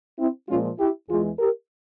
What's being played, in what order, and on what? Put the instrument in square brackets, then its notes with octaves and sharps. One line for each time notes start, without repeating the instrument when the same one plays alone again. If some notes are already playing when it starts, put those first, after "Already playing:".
[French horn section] C4 E4
A#2 F3 G#3 C#4 F4
E4 G4
E2 E3 G#3 F4 G#4
G4 A#4